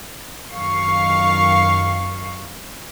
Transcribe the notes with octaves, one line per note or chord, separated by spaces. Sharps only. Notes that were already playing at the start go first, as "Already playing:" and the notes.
F#2 D#3 F5 C#6 C7